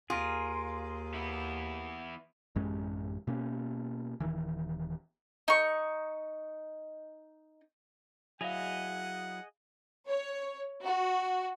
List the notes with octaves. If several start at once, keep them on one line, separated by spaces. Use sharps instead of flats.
D#2 F4 G#4 A#4
E3 B3 E4
A1 F#2 G#3 C#4
B2 A#3 C#4
D#1 D#3 E3
D#4 C#6
F#3 E4 G#4 D#5 F5 F#5 A#6 F7
C#5
F#4